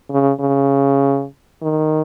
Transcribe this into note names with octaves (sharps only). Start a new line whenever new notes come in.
C#3
C#3
D#3